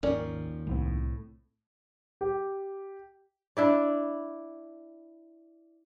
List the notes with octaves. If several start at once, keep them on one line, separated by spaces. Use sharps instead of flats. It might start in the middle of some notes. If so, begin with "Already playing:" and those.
G#1 D#2 F3 C#4 A#4 D5
C2 A2 G3 C4
G4
D4 E4 D5